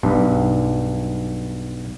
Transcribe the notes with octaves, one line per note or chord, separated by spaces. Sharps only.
B1 G2